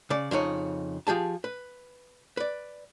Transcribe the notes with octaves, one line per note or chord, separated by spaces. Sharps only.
C#3 D5
F2 C#3 D#4 C#5
F3 G4 G#4 A5
B4
B4 D5